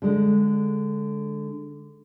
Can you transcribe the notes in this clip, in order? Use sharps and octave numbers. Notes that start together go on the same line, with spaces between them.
D3 G#3